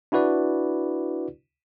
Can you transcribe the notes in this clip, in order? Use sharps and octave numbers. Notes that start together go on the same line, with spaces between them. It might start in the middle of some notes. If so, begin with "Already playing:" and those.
D4 E4 F#4 B4 D5